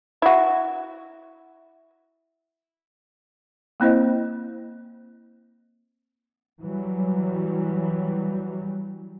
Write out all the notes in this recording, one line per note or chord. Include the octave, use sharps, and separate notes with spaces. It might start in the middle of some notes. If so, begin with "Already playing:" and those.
E4 F#4
A#3 C4 E4 C5 D#5
E3 F#3 G3